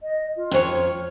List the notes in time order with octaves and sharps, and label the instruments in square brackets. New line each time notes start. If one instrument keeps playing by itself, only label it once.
[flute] D#5
F4
[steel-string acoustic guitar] F2 C#5 [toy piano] C#4 C5 G5